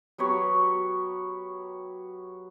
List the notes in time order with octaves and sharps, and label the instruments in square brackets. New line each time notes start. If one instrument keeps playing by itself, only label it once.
[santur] F#3 B3 G4 C#5